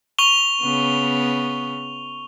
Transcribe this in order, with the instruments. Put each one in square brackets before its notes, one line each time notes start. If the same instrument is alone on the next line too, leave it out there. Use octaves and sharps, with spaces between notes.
[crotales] C#6 F7 G7
[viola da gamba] C#3 B3